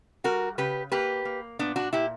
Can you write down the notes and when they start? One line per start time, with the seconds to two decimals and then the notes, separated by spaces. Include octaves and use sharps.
0.24 G3 F#4 A#4
0.58 C#3 G4 B4
0.92 A#3 G4 B4
1.25 A#3
1.59 A#2 B3 D4
1.76 D4 F#4
1.93 A#2 E4 G4